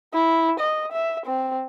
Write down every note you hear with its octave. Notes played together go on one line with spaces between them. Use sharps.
E4
D#5
E5
C4